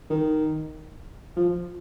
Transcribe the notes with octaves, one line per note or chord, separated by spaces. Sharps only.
D#3
F3